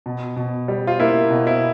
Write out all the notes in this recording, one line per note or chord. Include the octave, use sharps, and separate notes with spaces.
B2
B2
G3
F4
A#3 E4
B2
E4